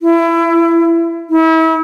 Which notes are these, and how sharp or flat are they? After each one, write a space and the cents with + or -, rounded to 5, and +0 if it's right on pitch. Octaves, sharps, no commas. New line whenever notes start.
E4 +25
E4 -35